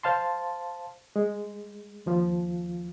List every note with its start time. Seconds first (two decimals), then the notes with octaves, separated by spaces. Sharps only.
0.03 C5 F5 A5 C6
1.16 G#3
2.06 D#2 F3 F4